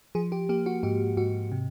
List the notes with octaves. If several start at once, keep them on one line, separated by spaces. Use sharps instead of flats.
F3 G#4
G4
A#3 G4
F#4
G#2 G4
G#2 F#4
C3